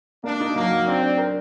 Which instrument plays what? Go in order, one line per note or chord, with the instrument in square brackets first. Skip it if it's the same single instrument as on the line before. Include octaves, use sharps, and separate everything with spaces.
[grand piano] A#3 [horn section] D4
[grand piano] D#4
[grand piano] F#3 [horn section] A#3
[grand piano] F#3
[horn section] C4 [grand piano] D4
[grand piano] D4
A#4